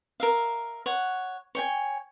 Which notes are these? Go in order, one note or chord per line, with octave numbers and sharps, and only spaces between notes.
A#4 E5 F5
C#5 F#5
C#5 G5 G#5